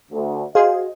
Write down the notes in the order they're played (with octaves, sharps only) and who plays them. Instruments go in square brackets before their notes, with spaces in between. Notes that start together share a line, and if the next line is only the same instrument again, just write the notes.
[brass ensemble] D2
[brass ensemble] F#4 D#5 [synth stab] G#4 C5 [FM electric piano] F5